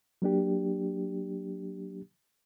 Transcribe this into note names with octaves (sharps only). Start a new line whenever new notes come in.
F#3 A#3 D4 G4